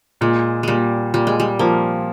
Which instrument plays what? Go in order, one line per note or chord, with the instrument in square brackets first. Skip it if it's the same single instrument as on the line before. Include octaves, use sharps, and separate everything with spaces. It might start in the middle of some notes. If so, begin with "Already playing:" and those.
[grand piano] A#2 [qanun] G#3
[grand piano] A#2 [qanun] G3 G#3
[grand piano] A#2 [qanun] G3
[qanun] G#3
G3
[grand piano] F3 [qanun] A#3